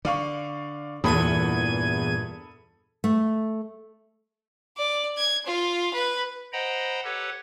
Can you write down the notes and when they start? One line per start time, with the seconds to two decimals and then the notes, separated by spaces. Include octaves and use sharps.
0.05 D3 D5 F5 C#6
1.04 E2 G2 A#2 A4 B5 D#6 G#6 D#7
3.04 A3
4.78 D5
5.17 G#6
5.46 F4
5.94 B4
6.53 C5 D#5 F#5 G5 A#5 B5
7.04 G4 A4 B4 C#5 F#5